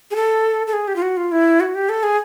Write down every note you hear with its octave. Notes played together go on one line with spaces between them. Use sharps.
G#4
A4
A4
G#4
G4
F4
F#4
F4
E4
F#4
G4
A4
G#4